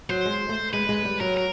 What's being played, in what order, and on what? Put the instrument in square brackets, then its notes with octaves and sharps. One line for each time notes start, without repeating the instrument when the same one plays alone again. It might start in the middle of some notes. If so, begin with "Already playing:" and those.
[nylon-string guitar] F#3 [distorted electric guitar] C5
[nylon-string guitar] G#3
A3
[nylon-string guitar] G#3 [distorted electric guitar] B4
[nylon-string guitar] G#3
G3
[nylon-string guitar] F#3 [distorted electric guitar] A#4
[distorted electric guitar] A#4